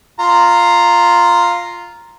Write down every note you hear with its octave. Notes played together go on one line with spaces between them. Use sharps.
F4 A#5